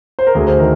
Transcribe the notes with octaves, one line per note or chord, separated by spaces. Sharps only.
C5
A#4
D2 G#4
C5
D#3 A#4